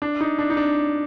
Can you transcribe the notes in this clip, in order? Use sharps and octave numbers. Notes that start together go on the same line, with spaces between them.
D4
D#4
D4
D#4
D4